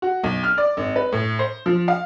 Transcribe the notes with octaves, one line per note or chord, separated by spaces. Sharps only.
F#4
B1
F6
D5
G#1
B4
A2
C5
F3
F5